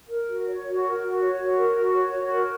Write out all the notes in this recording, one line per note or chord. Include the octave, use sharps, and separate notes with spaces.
A#4
F#4
C#5
F#4
A#4
F#4
C#5
F#4
A#4
F#4
C#5
F#4
A#4